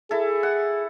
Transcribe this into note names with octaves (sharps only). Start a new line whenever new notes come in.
E4 G#4 A4
F#5